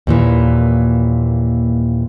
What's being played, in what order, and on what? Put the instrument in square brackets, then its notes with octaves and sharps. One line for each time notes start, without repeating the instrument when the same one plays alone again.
[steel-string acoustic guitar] D#2 A#2 E3